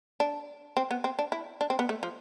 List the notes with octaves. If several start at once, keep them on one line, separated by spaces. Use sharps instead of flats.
D4
C4
B3
C4
D4
E4
D4
C4
B3
A3
F3